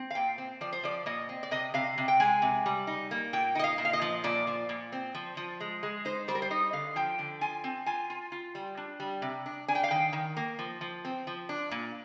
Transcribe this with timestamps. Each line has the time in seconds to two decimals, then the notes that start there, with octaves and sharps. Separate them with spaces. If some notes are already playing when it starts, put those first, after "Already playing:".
Already playing: C4
0.11 F5
0.15 A#2 G5
0.38 C4
0.61 F3 D5
0.73 C5
0.83 F3 D5
1.06 A#2 D#5
1.29 C4
1.43 D5
1.51 C3 D#5
1.74 C3 F5
1.98 C3
2.08 G5
2.20 G#3 G#5
2.42 C3
2.66 G3
2.87 D#4
3.11 A#3
3.33 A#2 G5
3.55 D#4 D#5
3.64 F5
3.78 A#2
3.85 F5
3.93 D#5
4.02 F3
4.24 A#2 D5
4.47 F3
4.69 A#2
4.92 C4
5.15 F3
5.37 F3
5.60 G#3
5.83 G#3
6.05 D#4 C5
6.28 G3 C5
6.35 A#4
6.42 C5
6.51 D#4 D#5
6.73 D3 F5
6.96 F3 G5
7.19 D3
7.41 F4 G#5
7.64 C4
7.86 F4 G#5
8.10 F4
8.32 F4
8.55 G3
8.77 D4
9.00 G3
9.22 C3
9.46 D4
9.68 D4 G#5
9.75 G5
9.83 F5
9.91 D#3 G5
10.13 D#3
10.37 A#3
10.59 F3
10.81 F3
11.05 C4
11.27 F3
11.49 D4
11.71 A#2